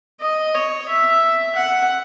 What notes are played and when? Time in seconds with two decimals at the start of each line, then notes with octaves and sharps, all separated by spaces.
0.21 D#5
0.54 C#5
0.88 E5
1.55 F#5